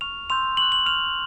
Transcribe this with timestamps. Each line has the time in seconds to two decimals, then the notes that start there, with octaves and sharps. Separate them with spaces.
0.01 C#6 F6 F7
0.30 C6 E6 G6 F7
0.57 C#6 F#6 F#7
0.72 F#7
0.86 C#6 F6 F7